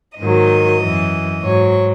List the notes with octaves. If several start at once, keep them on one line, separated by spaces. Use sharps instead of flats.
G#2 D#3 F#3 D#5
F#2 E3
G#2 F#3 C#5